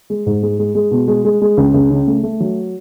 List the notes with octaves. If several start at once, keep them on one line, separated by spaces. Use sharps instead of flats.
G#3
G#2
G#3
G#3
G#3
B2
G#3
G#3
G#3
C#2
C#2
C#3
A3
A3
F#3